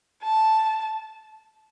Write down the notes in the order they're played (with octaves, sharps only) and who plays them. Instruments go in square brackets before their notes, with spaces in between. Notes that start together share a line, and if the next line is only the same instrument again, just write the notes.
[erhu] A5